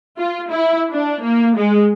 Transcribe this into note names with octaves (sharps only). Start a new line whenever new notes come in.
F4
E4
D4
A#3
G#3